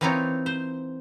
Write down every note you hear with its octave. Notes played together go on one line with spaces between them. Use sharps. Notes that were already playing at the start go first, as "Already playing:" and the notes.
E3 A#3 C4 D#4 F4 C#5
C5